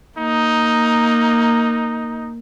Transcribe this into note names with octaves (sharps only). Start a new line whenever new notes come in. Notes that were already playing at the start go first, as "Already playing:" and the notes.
A#3 D#4